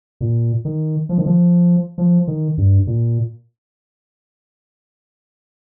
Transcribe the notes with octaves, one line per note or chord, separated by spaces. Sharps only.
A#2
D#3
F3
D#3
F3
F3
D#3
G2
A#2